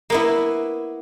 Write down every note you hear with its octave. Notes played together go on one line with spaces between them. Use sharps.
A#3 B3 E4